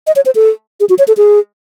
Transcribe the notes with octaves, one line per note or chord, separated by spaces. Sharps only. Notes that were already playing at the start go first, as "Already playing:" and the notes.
D#5
C#5
C5
A4
G#4
F#4
C#5
A4
G#4